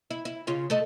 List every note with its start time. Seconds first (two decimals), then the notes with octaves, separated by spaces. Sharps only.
0.11 E4
0.25 E4
0.47 C#3 F4
0.70 A3 A4 D#5